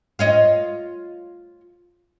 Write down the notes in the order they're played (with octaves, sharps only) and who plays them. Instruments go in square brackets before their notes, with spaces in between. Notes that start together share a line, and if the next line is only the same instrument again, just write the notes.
[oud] F4 C#5 D#5